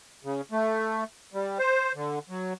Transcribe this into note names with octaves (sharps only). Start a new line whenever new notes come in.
C#3
A3
G3
C5
D3
F#3